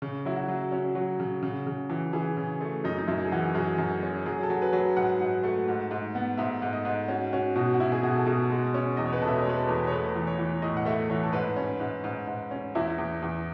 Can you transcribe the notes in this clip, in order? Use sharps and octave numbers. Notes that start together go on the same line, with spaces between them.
C#3
F#3 E4
F#4
F#3
C#4
F#3
C#3
C#3
C#3
E3
E3 G#4
C#3
A3
F#2 D#4
D#4
F#2 E4
G#4
E3 F#4
F#2 G#4
F#2
C#4
F#3 G#4
A4
F#3
B4
F#3
G#2 F#5
G#2
A3
G#2
G#2
B3
G#2 E5
G#2
D#5
G#2
C#4 F#4
C#4 F#4
B2 F#4
F#4
B2 E4
G#4
B2 F#4
A4
B2 G#4
G#3
C#4
E2 D#5
C#5
B4
B2 A4
E5
D#5
C#5
G#3 B4
A4
E2
C#5
A3 B4
E3
C#5
E3
A2 D#5
F#5
A3 E5
E3 C#5
A4
G#2 B4
C#4
G#2
G#2
G#2
C#4
E2 E4
E2
E2